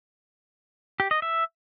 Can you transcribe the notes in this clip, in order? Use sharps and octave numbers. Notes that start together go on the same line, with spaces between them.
G4
D#5
E5